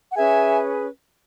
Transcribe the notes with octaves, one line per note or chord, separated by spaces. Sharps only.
F#5
C#4 G#4 B4 E5 G#5